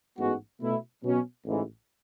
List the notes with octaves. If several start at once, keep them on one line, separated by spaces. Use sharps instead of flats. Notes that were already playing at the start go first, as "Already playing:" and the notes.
A1 G#2 G#3 B3 F#4
B2 A3 E4
B2 F#3 C#4
A1 G#2 E3